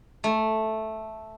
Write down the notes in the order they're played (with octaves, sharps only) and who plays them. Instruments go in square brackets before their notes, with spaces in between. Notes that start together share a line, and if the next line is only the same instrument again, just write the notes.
[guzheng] A3